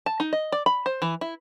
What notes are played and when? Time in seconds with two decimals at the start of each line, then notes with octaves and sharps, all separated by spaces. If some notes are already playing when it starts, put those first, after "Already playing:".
0.06 A5
0.20 D#4
0.33 D#5
0.52 D5
0.66 B5
0.86 C5
1.02 E3
1.21 E4